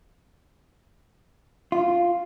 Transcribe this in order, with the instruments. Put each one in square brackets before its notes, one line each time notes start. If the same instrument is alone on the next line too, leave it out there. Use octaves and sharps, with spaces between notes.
[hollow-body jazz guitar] F4